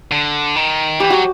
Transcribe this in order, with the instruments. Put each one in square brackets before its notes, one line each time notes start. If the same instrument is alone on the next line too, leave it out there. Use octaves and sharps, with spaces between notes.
[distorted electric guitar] D3
D#3
[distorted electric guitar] E3 [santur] G4
[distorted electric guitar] F#3 [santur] F#4